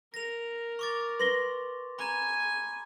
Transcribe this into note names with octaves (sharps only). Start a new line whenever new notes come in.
A#4 A#6 F7
C#6 D6 A6
B4 C6 A#6 G7
G#5 A#5 B5